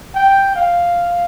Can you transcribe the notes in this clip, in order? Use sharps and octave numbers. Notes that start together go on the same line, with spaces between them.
G5
F5